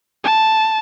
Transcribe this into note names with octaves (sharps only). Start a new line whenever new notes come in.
A5